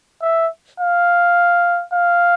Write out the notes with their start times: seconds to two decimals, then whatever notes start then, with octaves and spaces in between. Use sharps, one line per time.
0.22 E5
0.80 F5
1.93 F5